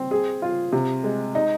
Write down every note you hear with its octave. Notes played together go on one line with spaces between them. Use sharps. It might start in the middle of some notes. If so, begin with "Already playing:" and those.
Already playing: C4
G#4
F4
C3
G#3
D#4